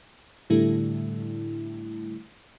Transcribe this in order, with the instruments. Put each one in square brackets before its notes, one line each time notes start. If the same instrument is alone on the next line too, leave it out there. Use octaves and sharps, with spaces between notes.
[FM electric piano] A2 D3 G3 A3 E4